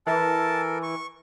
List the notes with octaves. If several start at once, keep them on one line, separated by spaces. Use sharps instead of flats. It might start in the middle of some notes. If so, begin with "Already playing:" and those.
E3 A4 A#4 A5
C#6